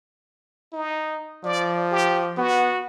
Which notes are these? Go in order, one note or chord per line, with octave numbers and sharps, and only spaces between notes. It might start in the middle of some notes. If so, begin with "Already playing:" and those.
D#4
F3 D5
G4
B3 F#4